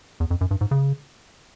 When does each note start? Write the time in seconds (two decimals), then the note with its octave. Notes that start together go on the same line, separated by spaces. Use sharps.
0.20 E2
0.31 F2
0.41 F#2
0.51 G2
0.61 G#2
0.71 C#3